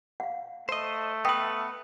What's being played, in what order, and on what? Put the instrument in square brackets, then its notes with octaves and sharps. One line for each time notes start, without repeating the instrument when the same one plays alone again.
[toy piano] F5 F#5
[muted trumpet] A3 [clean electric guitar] C5 D#5
[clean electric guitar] B3 B4 [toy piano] E5 G5 [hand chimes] D#6